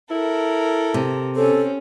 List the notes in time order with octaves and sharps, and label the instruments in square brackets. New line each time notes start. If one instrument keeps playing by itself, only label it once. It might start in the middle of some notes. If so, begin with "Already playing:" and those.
[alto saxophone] E4 [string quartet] A4 A#4
[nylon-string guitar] C3
[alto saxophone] C4 [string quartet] C#4 [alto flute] A4